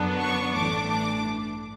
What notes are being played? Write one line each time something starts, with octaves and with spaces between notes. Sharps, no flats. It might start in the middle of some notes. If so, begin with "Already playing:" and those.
Already playing: F#2 D3 F#3 B3 D4
C#6
A1 G2 E3 A3 D4 D6
D6